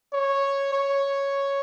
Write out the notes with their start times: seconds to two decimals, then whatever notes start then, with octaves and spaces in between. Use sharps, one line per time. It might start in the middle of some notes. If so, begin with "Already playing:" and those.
0.13 C#5
0.73 C#5